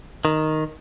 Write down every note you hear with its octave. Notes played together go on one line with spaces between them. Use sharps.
D#3